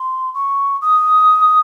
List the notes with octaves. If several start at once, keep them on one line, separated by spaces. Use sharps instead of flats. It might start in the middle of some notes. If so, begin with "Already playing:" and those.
Already playing: C6
C#6
D#6